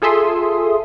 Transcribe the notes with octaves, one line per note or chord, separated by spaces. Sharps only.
F4 G#4 A4 E5 C6 D#6